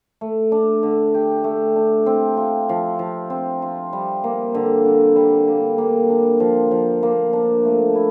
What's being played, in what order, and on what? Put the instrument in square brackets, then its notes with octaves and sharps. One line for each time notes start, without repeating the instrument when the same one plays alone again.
[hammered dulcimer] A3
D4
D3
G4
A3
D4
C4
F4
F3
F3
C4
F4
G3
A#3
D3
D3
G3
A#3
A#3
D4
F3
F3
A#3
D4
A3
E4